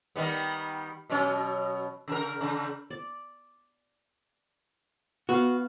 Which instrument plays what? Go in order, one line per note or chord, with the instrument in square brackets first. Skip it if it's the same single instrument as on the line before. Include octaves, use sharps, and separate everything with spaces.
[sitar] D#3 G3 B3
B2 F#3 C#4
C#3 A#4
C#3
[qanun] D5
[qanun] B3 F5 [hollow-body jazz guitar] F#4